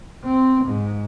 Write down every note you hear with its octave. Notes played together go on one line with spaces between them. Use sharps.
C4
G#2